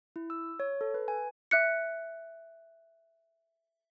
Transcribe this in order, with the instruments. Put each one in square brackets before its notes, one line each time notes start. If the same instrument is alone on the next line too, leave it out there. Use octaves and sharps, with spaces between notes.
[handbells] E4
E6
C#5
A4
B4
G#5
[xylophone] E5 F#6 C#7